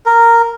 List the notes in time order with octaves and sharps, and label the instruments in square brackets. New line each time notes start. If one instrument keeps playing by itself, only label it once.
[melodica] A#4